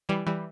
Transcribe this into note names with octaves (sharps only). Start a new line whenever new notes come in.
E3 G3
E3 G3